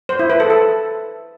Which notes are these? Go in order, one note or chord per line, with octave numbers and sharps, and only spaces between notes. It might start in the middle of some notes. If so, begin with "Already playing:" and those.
C5
E4
B4
A4
A4